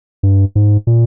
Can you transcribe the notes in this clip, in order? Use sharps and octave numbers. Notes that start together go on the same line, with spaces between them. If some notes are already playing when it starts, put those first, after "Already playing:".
G2
G#2
A#2